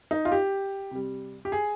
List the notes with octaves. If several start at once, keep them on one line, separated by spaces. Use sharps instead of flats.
D#4
F4
G4
C3 G3
G4
G#4